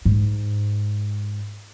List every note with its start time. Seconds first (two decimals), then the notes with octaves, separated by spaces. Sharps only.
0.05 G#2